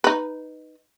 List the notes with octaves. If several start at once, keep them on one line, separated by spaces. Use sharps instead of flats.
D#4 B4